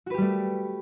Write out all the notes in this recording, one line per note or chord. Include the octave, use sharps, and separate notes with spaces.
G3 A3 F#4 G4 B4